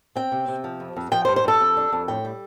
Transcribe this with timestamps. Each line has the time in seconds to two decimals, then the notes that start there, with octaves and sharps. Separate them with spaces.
0.16 C4 G5
0.32 C3
0.48 C3
0.64 F3
0.80 F2
0.96 F2
1.12 F3 G5
1.25 C5
1.28 G2
1.36 C5
1.44 G2 A4
1.61 F2
1.77 D4
1.92 F2
2.08 A2 G5
2.25 G3